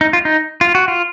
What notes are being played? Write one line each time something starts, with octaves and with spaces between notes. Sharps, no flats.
D#4
F4
D#4
F4
F#4
F4